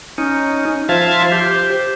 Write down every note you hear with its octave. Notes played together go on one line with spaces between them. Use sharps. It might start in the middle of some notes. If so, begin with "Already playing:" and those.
C#4 D#4
F3 F4 E5 F5 A5 G#6
G4 C5